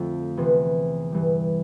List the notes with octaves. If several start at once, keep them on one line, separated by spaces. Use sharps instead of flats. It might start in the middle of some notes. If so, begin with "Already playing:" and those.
Already playing: F2 D3 F3 A3 C4
E2 C3 E3
G2 E3 G3